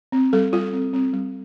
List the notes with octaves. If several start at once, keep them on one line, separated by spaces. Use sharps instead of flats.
C4
G3 A4
G3 F4
C4
C4
G3